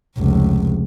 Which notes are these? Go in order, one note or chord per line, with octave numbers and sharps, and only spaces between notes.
F1 C#2